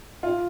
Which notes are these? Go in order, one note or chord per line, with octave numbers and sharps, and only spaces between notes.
F4